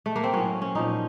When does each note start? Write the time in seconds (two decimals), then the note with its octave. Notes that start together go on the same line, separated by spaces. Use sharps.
0.06 A3
0.16 A#3
0.24 C4
0.33 A2 F#3 C#4
0.62 C#4
0.75 A#2 F3 D#4